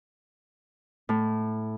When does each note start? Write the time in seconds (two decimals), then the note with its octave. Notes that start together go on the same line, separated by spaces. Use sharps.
1.09 A2